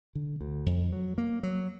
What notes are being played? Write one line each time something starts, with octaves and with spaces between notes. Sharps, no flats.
D3
D2
F2
F#3
A#3
F#3